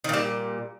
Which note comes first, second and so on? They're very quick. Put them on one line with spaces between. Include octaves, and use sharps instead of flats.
D#3 A#2 G3